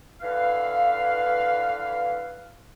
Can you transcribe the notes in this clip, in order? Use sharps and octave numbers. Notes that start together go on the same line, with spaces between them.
D3 E3 B4 F5